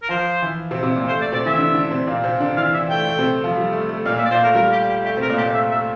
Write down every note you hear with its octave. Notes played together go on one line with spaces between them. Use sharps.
A#4
F3 F4 C5
E3 E4
C3 C4
C3 C4
A#2 A#3
A3 C5
A3 D5
C3 C4 D5
E3 E4 E5
D3 D4
D3 D4
C3 C4
A#2 A#3
C3 C4
D3 D4
E3 E4 F5
E3 E4 E5
A3 G5
A3
C3 C4
F3 F4
G3
A3
A3
A#2 A#3 F5
A#2 A#3 E5
D5
A#2 A#3 C5
A3 A#4
G3 A#4
G4
G4
A3 G4
C3 C4 A#4
A#2 A#3
G4
A#2 A#3
A3 E5
A3 E5